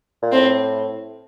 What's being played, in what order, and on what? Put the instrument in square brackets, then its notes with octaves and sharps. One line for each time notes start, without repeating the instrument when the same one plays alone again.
[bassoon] A#2
[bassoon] A2 [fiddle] C4